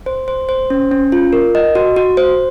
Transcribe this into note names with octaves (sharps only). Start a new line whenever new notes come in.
C5
C5
C5
C#4
C#4
F4
A#4
D#5
F#4
F#4
C5